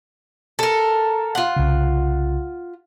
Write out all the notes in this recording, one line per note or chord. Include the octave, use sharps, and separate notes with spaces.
A4 A#4
F4 F#5
C2 C#3